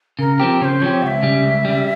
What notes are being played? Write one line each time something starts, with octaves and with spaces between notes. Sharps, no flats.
C#3 A#4
F3 C4 G4
C#3 C5 C#5
F3 C4 G4 C#5
C#2 E5 F#5
C#3 G3
C#2
C#3 G3